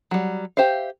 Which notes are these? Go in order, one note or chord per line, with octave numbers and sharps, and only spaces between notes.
F#3 G3
G4 C5 E5 F5